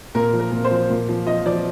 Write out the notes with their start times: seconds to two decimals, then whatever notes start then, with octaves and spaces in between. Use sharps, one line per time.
0.15 A#2 A#4
0.33 F3
0.40 A#4
0.51 A#2
0.64 C5
0.71 F3
0.90 A#2
1.09 F3
1.27 F3 D#5
1.45 F3 D5